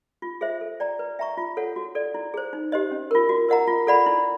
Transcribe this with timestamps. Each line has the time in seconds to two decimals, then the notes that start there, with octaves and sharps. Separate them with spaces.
0.22 F4
0.41 G#4 C5 E5
0.61 A4
0.80 D5 G5 A#5
0.99 B4
1.19 E5 G5 A#5 C#6
1.37 F4
1.57 A4 C#5 F#5
1.76 F#4
1.95 A4 D5
2.14 E4
2.34 G#4 C5
2.53 D#4
2.72 G4 C5 D#5
2.91 C#4
3.11 F4 A#4
3.29 F#4
3.49 A#4 D#5 F#5 A#5
3.67 F4
3.87 A4 D5 F#5 B5
4.06 E4